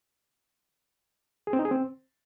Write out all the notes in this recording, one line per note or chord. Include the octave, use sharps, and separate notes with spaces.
G#4
C4
D#4
G#4
C4